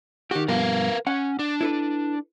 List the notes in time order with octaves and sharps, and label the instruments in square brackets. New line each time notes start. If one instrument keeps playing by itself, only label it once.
[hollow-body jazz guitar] D#3 F#4 [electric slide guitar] G4
[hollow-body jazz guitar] G2 B2 F3 [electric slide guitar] A#4 B4 F5
[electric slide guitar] C#4 [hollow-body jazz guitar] F#5
[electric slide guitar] D4
[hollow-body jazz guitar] E4 A4 B4